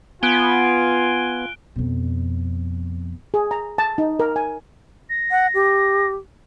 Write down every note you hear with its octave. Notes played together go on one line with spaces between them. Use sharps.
B3 F4 G#5 F#6 D7 G7
F2 B2
G#4
A#5
A5
D#4
A#4
G#5
A#6
F#5
G4